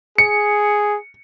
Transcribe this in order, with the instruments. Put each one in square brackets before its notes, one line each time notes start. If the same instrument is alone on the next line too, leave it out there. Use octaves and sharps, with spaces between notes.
[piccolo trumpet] G#4 [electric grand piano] C#7